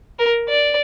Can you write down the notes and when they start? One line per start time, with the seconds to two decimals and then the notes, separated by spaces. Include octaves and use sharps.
0.19 A#4
0.48 D5